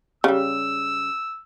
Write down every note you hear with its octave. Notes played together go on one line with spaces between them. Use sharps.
C#3 G3 E6